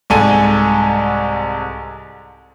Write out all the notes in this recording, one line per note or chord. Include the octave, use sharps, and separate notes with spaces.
C2 G#2 A4 G#5 D#7